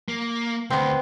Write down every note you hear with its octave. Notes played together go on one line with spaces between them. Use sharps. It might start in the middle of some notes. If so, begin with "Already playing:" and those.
A#3
D2 B3 C4